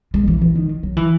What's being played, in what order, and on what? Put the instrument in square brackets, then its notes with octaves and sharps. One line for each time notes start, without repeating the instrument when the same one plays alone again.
[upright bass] G#3
E3
E3
D#3
F#3
E3